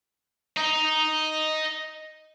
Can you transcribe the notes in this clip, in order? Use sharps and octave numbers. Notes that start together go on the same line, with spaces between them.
D#5 A#5